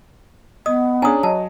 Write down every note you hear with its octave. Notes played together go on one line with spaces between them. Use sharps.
B3 D#5 D#6
C#4 D4 G#4 C#5 G#5 A#5 D#6
F#3 D#5 A5